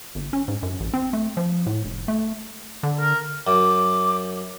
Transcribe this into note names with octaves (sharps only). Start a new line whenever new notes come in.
G1
C#4
G#2
F#2
A1
C4
A3
F3
A2
F1
A3
D3
A#4
F#2 D6